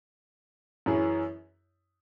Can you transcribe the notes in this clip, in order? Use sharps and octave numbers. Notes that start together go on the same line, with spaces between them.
F#2 E3 C#4 E4 G#4